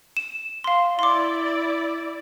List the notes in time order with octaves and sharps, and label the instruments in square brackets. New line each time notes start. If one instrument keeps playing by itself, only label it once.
[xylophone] E7
F5 C6
[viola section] E4 D5 [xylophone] C6 D6